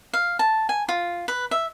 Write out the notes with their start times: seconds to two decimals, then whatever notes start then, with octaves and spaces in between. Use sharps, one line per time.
0.13 F5
0.39 A5
0.69 G#5
0.89 F4
1.28 B4
1.51 E5